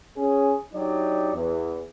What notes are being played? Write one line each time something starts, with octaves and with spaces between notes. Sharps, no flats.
C#4 G#4
F#3 D4 D#4 G4 D5
E2